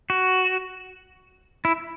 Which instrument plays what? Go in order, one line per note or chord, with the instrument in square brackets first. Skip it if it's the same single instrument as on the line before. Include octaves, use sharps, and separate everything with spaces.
[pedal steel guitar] F#4
E4